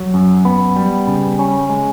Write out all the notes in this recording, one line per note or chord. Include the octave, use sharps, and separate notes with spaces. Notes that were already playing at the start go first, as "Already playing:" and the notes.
Already playing: F#3
F#2
B3
G3
C#3
C#4
G#3